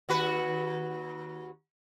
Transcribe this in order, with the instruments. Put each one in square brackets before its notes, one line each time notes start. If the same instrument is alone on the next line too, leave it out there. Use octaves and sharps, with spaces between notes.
[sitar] D#2 F#4 B4